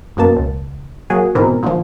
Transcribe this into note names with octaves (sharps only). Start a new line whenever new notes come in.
F#2 B2 A#3 A5
C#2
F#3 A#3 F#4 G#4
G#2 B2 D#3 E3 C4 A#4
A#2 D3 D#3 F3